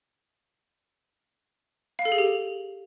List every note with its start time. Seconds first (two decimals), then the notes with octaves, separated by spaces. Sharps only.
1.99 F5
2.05 A4
2.12 G#4
2.18 G4